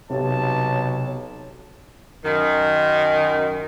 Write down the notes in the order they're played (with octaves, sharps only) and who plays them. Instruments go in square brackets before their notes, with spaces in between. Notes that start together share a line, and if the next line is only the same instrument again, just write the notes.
[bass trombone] B1 [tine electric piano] C3 [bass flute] C#5 [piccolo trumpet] A5
[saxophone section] F#2 D#3